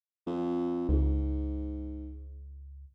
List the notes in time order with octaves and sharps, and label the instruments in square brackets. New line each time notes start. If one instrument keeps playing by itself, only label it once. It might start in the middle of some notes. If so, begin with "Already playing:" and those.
[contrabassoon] F2
[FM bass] C#2 [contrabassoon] G#2